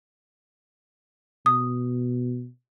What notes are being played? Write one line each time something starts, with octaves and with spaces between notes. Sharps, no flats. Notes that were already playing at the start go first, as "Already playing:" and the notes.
B2 D#6